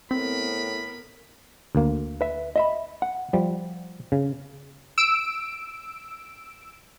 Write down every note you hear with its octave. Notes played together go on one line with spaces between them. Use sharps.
A2 B3 C4 A#4 B5
D2 A#3
B4 E5
D#5 E5 B5
F#5
F3 G3
C#3
E6 D7